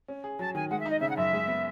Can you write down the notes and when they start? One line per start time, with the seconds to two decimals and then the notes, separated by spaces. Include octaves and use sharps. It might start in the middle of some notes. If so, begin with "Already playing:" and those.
0.08 C#4
0.24 G#4
0.39 F#3 A5
0.55 D#3 G#5
0.70 G#3 F#5
0.81 E5
0.86 D#4 D#5
1.01 C#3 E5
1.09 F#5
1.16 F#2 E5
1.33 G#3
1.48 B3